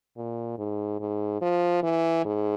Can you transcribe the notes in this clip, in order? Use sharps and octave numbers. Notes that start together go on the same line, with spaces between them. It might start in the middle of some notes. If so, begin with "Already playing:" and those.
A#2
G#2
G#2
F3
E3
G#2